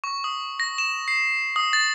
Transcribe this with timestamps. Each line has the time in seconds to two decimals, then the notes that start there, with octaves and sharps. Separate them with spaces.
0.04 C#6
0.24 D#6
0.60 A#6
0.78 E7
1.08 C7
1.56 D#6
1.73 A6